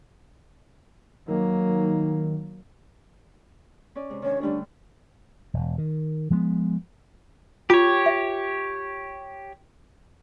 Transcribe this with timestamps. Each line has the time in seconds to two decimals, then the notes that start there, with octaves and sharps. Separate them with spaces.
1.28 D#3 F#3 A#3
3.95 C#4 D5
4.10 C3 G#3
4.22 D#3 C#4 D4 C#5
4.41 D3 G3 A3 D4
5.54 E1
5.78 D#3
6.30 F3 G#3 A3 B3
7.70 F4 G4 C#5 D6
8.06 E5